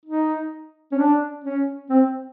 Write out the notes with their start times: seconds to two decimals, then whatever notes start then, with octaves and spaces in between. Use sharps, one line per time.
0.05 D#4
0.92 C#4
0.98 D4
1.44 C#4
1.90 C4